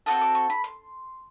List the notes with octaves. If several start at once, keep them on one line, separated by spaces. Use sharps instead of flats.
C4 D#4 F#4 A4 D#6
D6
C#6
B5
C6